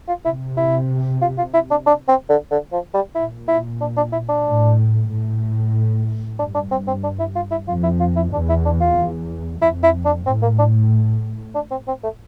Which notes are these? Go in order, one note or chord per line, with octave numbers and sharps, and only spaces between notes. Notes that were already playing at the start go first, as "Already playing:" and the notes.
F4
C3 E4
E4
F4
F4
E4
D4
D4
C4
D3
D3
F3
G3
A#2 E4
E4
D4
D4
E4
D4
A2
A2
G2 D4
D4
C4
C4
D4
E4
F4
E4
F2 F4
E4
F4
E4
E2 D4
E4
D4
F4
E2
F2 E4
E4
D4
A2 C4
A#3
D4
D4
C4
C4
A3